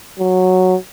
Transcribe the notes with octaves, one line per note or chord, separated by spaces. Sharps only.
F#3